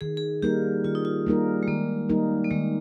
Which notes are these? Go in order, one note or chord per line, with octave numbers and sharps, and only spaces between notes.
D#3 G#4
G#4
G3 A#3 D#4 G4 A#4
D#3 F4
D#4
F4
G3 A#3 D#4 A#4
G#3
D#3 A#3
G3 A#3 D#4 A#4
A#3
D#3 G#3